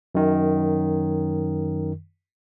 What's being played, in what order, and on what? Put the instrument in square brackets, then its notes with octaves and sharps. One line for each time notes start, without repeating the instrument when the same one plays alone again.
[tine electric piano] F#2 D#3